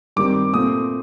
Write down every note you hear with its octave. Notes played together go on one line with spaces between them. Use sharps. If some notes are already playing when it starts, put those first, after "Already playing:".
G2 D#3 G3 C4 D6
A#2 A3 C4 D#6